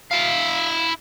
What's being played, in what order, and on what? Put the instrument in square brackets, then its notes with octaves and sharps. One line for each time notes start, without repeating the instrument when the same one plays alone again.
[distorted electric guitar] E4 F5